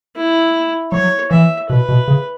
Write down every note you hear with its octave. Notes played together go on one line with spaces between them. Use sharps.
E4
F#3 C#5
E3 E5
B2 B4
B2
C#3